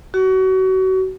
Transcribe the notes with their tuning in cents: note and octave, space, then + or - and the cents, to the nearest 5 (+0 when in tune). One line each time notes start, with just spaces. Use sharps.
F#4 +30